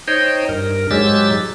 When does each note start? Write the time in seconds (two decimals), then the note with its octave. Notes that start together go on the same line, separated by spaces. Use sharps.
0.08 D#4 C5 C#5 D#5 G5
0.49 G2 A#4
0.91 G#2 F#3 G#3 G4 E6 A6